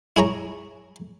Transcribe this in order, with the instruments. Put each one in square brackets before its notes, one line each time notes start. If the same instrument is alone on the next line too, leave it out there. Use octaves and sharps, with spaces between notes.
[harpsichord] E4 G#4 C#5 A#5